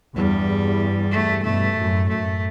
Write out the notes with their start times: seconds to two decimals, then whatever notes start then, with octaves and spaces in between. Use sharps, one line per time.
0.16 E2 G2 G3
1.12 A3
1.43 G2 B2 A3
1.76 F#2 A2
2.08 F#2 A3